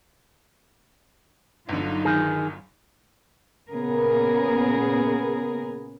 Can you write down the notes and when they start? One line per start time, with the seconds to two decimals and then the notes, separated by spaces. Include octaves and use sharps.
1.69 G1 D3 F#3 D#4 F4
2.05 D#3 G#4
3.71 A#2 C#3 B3 G#4 A#4